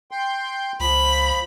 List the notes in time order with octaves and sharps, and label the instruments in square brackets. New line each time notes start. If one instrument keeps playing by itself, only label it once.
[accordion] G5 C6
[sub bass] C#2 [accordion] F3 [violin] B5